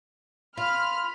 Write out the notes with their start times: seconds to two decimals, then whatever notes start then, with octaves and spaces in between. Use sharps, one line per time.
0.57 F4 B5 F6